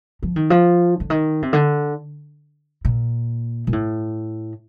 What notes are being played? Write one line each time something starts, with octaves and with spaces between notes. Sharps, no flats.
F3
D#3
F3
D3
D#3
C3
D3
A#2
A#2
A2